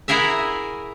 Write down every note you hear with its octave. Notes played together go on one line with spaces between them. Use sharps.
E4 F#4 G#4 A#4 E5